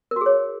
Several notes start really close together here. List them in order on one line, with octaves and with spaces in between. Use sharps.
A#4 F#4 G#4 C#5